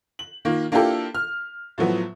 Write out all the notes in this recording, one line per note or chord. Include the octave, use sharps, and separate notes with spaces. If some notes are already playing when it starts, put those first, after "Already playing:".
F#7
D#3 A#3 F4
A#3 D4 E4 F4 G4 A4
F6
A2 F3 F#3 B3